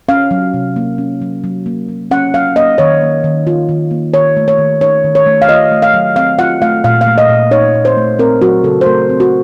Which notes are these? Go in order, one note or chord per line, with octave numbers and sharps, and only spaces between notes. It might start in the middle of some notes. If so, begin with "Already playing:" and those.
C#4 F5
F#3
C3
A#3
C#4
F#3
F#3
A#3
F#3
C#4 F#5
F#3 F5
A#3 D#5
D#3 C#5
A#3
D#3
F4
D#3
A#3
D#3 C#5
A3
C#5
D#3
D#4 C#5
D#3
C#5
A3
F5
F4 D#5
A3
F5
F#3
C4 F5
F4 F#5
A3 F5
A#2 F5
F5
A3
D#5
A#2
D#4 C#5
A#2
C5
A3
C4 A#4
F#3 F#4
C#3 A4
C5
A3 A#4
C4
F#4